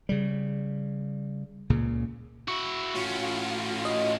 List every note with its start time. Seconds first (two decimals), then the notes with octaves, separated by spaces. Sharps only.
0.09 C#3 G3
1.70 C#2 A#2 C#3
2.48 E4 F#4 C#6
2.95 A2 C#4 F4 F#4
3.85 D#5